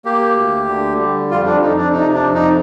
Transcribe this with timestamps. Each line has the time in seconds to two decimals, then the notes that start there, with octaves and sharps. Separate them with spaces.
0.05 A#3 G4
0.36 D2
0.68 D3
0.99 G3
1.31 F2 F4
1.45 D4
1.61 F2 D#4
1.77 D4
1.92 C3 D#4
2.14 D4
2.24 F2
2.34 D#4